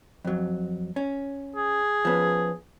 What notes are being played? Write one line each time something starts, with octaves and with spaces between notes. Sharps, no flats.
F2 F#3
C#4
G#4
F3 B3 C#4